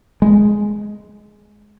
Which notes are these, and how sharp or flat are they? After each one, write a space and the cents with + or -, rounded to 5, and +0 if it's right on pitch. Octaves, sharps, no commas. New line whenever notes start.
G#3 +5